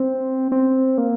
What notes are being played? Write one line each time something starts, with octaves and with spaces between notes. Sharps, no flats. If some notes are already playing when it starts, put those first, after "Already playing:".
Already playing: C4
C4
A#3